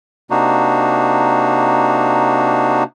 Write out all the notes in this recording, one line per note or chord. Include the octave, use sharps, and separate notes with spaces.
C3 A#3 D4 D#4 F#4